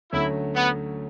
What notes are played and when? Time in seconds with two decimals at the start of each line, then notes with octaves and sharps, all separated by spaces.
0.12 D2 D3 F#3 A3 C#4 E4
0.55 B3